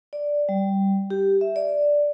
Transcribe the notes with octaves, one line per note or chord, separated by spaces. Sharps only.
D5
G3
G4
E5
D5